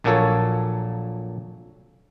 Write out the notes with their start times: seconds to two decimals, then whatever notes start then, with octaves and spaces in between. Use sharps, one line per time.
0.04 A#1 A#2 F#3 A#3 A4 C#5